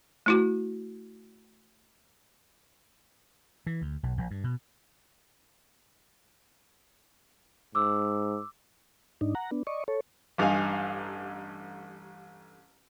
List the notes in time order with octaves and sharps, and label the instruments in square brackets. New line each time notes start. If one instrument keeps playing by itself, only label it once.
[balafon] A3 E4 F#4
[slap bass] E3
D2
B1
A#1
G2
B2
[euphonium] G#2 [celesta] D6 E6
[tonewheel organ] G#2 D4 D#4
F#5 A#5
B3 D4
D5 D#5 C#6
A4 C#5
[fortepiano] A1 G2 D#4 F5 G#5